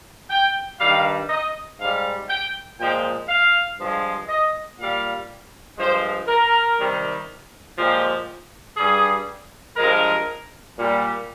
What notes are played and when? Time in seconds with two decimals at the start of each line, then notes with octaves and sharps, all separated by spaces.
0.30 G5
0.79 G2 D#3 G3 F5
1.29 D#5
1.79 G#2 G3 F5
2.29 G5
2.78 A#2 F3 G#3 G5
3.28 F5
3.79 G2 F3 G#3
4.28 D#5
4.78 A#2 G3 F5
5.78 G2 F3 G#3 C5
6.27 A#4
6.78 C3 D#3 G3
7.77 A#2 F3 G#3 G4
8.77 G2 G3 G#4
9.76 G2 F3 G#3 A#4
10.76 A#2 G3